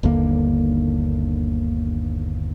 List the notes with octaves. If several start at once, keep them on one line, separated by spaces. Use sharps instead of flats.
G1 D#2 D3 A#3